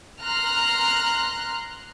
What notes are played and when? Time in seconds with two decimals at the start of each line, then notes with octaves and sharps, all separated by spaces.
0.23 A#5 C6 F6 F#6